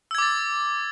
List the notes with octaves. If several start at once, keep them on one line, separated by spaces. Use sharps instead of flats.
D6 E6 G#6 A6